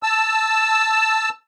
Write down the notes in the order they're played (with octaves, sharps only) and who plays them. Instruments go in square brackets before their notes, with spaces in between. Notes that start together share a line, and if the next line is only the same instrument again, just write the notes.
[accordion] A5 E6